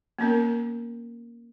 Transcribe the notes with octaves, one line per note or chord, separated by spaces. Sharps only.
A#3 B3 C#4 A#4